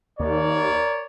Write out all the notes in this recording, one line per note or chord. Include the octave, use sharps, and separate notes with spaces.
D#2 A#4 C#5 D5